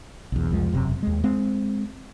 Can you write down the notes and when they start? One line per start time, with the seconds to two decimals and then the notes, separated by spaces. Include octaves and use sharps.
0.32 B1 E2
0.51 C2 F2 F3 G#3
0.72 E1 F#2 C3
1.03 D#2 G#3
1.24 G#3 C4